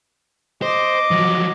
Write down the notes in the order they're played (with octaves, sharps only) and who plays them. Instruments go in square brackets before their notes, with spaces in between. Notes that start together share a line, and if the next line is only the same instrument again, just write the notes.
[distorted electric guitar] C5 [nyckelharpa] D#5 D6
[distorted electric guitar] F3 F#3